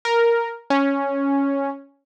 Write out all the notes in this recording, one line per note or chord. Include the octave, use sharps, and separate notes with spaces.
A#4
C#4